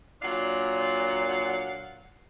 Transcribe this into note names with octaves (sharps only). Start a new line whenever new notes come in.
A#2 F#3 D4 F5 F#5